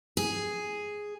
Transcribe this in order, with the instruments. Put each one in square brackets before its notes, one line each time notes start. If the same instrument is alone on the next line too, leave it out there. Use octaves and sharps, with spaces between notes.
[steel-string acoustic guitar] G#4